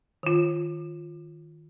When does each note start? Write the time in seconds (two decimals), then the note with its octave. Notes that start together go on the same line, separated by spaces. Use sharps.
0.23 D#3 F4